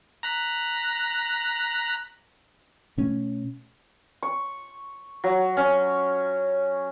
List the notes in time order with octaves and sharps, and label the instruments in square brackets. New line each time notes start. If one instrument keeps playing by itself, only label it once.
[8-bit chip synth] A#5 F#6 B6
[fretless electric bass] B2 A3 C#4
[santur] C#6
F#3
C#4